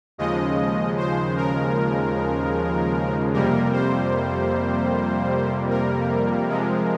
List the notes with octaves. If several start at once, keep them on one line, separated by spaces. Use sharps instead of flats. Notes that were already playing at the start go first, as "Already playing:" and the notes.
D#2 C#3 F3 G#3 D#5
C5
A#4
F2 C3 G3 A#3 A#4
C5
A#4
C3 F3 G#3